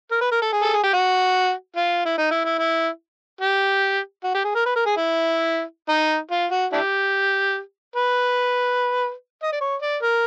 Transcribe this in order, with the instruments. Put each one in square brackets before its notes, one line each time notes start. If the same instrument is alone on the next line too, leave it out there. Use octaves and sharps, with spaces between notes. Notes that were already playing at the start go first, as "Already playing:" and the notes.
[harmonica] A#4
B4
A#4
A4
G#4
A4
G#4
G4
F#4
F4
E4
D#4
E4
E4
E4
G4
F#4
G4
G#4
A#4
B4
A#4
G#4
E4
D#4
F4
F#4
D4 E4 G4
B4
D#5
D5
C#5
D5
A#4